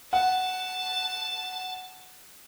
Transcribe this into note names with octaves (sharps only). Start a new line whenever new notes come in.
F#5 A5